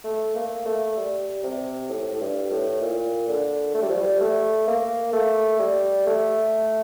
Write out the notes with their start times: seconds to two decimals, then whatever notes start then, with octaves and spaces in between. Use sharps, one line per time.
0.04 A3
0.35 A#3
0.66 A3
0.97 G3
1.43 C3
1.89 A2
2.12 A2
2.21 G2
2.51 A2
2.81 A#2
3.28 D3
3.74 A3
3.82 G3
3.89 F3
3.97 G3
4.21 A3
4.68 A#3
5.13 A3
5.59 G3
6.06 A3